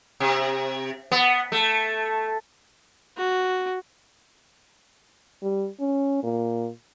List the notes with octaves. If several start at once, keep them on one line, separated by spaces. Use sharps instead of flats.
C3
B3
A3
F#4
G3
C#4
A#2